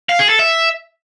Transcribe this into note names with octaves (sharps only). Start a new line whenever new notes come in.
F5
G#4
A4
E5